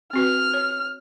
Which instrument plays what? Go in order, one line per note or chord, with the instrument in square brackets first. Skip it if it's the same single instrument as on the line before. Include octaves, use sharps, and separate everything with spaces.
[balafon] C4 F#4 B4 [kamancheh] F6
[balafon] C#5